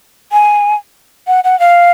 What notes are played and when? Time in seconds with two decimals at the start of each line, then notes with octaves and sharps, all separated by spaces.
0.32 G#5
1.27 F#5
1.44 F#5
1.60 F5